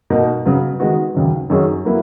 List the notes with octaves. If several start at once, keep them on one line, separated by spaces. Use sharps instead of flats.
B2 A#3 D#4
C#3 F#3 B3
D#3 G#3 B3 F#4
D#2 C#3 F#3
F#2 D#3 F#3 C#4 G#4
F#3 A#3 E4 B4